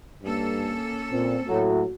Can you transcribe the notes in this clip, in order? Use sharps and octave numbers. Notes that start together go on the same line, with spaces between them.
G2 A#3 C#4 A4
A#2 C4
A2 F#3 A3 F#4